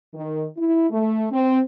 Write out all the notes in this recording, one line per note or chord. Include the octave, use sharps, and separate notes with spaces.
D#3
E4
A3
C4